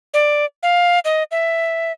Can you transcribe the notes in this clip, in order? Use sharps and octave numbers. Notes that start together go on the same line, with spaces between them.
D5
F5
D#5
E5